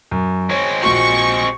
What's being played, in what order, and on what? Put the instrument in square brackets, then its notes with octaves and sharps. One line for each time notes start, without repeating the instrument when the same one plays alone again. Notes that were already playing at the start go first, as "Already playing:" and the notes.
[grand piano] F#2
[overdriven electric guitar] G#3 C4 [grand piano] C#5 C#6
[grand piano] A#1 F#4 [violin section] C#6